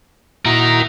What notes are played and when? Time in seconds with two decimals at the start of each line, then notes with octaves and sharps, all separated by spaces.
0.45 A#2 E4 F#4 A#4 D#5 A#5